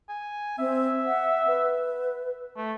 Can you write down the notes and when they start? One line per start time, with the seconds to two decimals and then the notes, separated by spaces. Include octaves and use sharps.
0.09 G#5
0.58 C4 E5
1.06 F#5
1.47 B4
2.57 A3